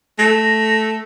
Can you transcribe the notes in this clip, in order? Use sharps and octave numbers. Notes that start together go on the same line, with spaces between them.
A3 A#6